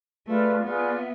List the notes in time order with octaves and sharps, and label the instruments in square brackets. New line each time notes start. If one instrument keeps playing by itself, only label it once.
[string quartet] A3 [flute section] F4 G#4 B4 D5
[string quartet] B3 [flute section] F4 G#4 B4 D5
[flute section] E5